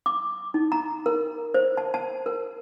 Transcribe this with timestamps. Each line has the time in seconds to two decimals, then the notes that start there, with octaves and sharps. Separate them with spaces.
0.06 D6
0.54 D#4
0.72 A#5
1.06 A#4
1.54 C5
1.77 A5
1.94 A5
2.26 A#4